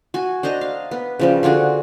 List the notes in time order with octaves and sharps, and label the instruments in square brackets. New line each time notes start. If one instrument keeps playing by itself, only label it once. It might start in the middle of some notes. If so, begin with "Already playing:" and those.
[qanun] F#4 G#5
D4 C5 D#5 A#5
F5
B3
C#3 F3 G3
D3 F4 F#4 G#4